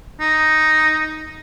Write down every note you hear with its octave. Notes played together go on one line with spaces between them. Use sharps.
D#4